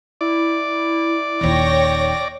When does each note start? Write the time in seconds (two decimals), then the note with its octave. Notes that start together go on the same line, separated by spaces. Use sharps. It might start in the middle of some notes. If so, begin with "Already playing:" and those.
0.21 E4 D5
1.41 D#1 D#2 C#5 G5 A#6